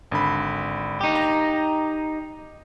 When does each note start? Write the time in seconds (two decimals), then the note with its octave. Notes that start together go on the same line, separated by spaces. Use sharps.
0.12 G#1 D3 B5
1.01 D#4 G4
1.16 A#5